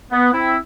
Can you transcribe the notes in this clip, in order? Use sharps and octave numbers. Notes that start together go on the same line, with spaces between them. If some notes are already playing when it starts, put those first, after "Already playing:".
B3
C4 E4